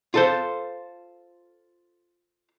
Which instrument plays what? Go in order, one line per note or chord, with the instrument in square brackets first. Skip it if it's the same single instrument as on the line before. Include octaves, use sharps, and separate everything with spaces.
[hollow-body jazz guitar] F4 A4 C5